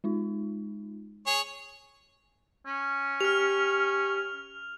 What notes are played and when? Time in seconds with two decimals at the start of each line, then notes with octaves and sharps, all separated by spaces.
0.04 G#3 D#4 F4
1.27 G#4 C#5
2.66 C#4
3.21 G4 F6 F7